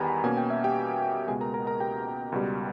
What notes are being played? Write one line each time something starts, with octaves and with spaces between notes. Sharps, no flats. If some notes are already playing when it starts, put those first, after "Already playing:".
Already playing: E2 D#3 G3 B3 B4 G#5 A#5 B5
B2 A#3 C#4 G#5
G5
E5
G4 G5
C#2 B2 G#3 G#4 G#5
A#4 A#5
A#4 A#5
A#4 A#5
G4 G5
C#2 B2 G3